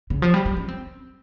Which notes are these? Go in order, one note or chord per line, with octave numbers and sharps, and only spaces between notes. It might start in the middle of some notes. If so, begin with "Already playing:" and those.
C#3
F3
G3
G3
C#4
C4